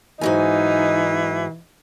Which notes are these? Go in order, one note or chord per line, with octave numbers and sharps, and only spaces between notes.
G#2 E3 F#3 D#4 G#5